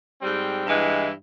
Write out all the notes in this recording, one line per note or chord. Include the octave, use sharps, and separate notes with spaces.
G#2 G3 C4
G2 E3 G#3 E4